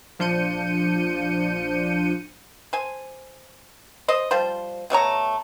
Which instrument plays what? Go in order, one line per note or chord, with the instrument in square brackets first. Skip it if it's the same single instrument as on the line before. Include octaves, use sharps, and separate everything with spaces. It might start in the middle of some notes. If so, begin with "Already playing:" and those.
[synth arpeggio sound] A#1 F3 D4 G6 C#7 D#7
[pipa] C5 G#5
C5 D#5
F3 G3 F4 C5
B2 A3 C#5 A#5